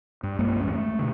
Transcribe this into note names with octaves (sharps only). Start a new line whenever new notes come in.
G2
B1 G2 G#3 A#3
A1 D#2 G#3 C#4
A3
B2 D3